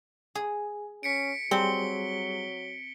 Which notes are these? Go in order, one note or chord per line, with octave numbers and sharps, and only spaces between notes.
G#4
C#4 B6 C#7 D7
F#3 G3 C4 G#4 G7